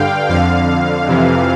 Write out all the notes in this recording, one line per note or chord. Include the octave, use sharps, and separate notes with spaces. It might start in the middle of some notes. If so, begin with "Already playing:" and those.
Already playing: G2 D3 F5 G5
F2 D3 F5
F2 C3 E3